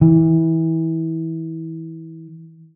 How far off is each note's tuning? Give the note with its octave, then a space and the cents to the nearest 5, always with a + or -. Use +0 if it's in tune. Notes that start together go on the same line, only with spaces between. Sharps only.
E3 -25